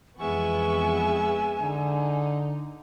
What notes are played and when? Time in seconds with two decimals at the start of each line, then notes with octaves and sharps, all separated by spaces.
0.20 F2 E3 G#3 B3 E5 G#5 C#6
1.62 D3 D#4